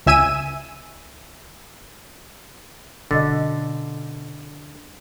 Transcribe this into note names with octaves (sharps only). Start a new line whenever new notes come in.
C#2 E5 G#5 E6 D#7
B2 D3 C#4 D#5 A6